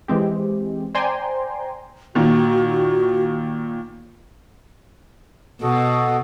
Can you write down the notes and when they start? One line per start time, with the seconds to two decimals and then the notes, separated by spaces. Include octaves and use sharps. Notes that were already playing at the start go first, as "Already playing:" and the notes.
0.08 E3 G#3 C4 G4
0.95 C5 D5 G5 G#5 A#5 C6
2.15 A#2 D#3 F#4
5.63 B2 F#4 A4 D#5